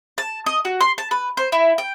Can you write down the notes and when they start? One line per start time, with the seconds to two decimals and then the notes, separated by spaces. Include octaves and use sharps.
0.18 A5
0.46 D#5
0.65 F#4
0.81 C6
0.98 A5
1.11 B4
1.37 C5
1.52 E4
1.78 G5